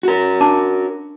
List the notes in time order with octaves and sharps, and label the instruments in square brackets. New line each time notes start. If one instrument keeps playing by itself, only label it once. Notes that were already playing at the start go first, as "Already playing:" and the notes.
[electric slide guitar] F#4 A#4
[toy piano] D4 A5 D6